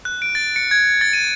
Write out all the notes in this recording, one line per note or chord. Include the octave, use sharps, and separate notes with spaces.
F#6
D7
A6
C#7
G#6
A6
D#7